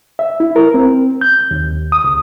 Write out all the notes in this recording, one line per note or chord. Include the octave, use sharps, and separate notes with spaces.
E5
E4
A#4
C4
G6
D#2
D#6
C#2